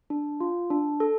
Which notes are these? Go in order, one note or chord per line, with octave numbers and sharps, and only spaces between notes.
D4
F4
D4
A4